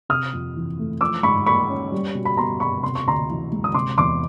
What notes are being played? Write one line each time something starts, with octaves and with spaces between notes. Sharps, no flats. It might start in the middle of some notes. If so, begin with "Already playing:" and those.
C3 D#6 F6
F2
E3
A3
F3 D6 E6
G#2 B5 C#6
A#3 B5 C#6
C#4
G3
B2
B5
B3 A#5 C6
B2 B5 C#6
C3 C6
C#6
D2 A#5 C6
E3
G#3
D#6
C3 C6 D6
E2 C6 D6